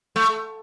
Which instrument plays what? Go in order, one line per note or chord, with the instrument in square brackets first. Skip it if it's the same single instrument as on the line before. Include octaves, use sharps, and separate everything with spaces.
[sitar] A3